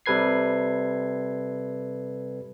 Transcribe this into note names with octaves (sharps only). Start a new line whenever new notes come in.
C3 G3 A4 B4 G#6 C7